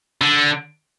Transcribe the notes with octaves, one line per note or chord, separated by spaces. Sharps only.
D3